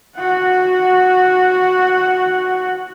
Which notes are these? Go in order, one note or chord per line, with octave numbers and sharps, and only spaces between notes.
F#4 F#5